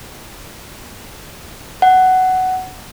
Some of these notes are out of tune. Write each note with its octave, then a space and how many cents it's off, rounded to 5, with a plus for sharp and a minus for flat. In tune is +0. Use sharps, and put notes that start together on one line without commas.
F#5 +10